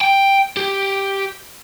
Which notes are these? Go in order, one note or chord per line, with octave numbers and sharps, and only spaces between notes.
G5
G4